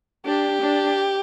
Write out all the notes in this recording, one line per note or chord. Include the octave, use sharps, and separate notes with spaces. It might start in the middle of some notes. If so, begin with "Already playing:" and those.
D4 G4
D4